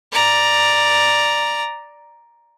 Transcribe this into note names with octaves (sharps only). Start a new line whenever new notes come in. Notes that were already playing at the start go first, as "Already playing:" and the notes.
D5 A#5